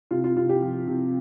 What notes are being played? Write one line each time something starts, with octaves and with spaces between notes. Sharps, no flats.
C3 F4
F4
C3 F4
G4
F3
C3